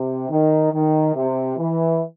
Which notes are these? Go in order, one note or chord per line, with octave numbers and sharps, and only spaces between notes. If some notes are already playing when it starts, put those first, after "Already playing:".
Already playing: C3
D#3
D#3
C3
E3